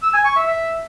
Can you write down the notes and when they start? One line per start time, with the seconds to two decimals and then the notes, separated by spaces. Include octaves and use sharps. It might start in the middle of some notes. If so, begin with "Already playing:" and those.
0.03 E6
0.14 G#5
0.25 C#6
0.36 E5
0.47 E5